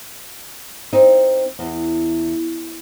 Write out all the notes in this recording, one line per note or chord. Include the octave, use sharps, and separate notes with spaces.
C4 D#4
E2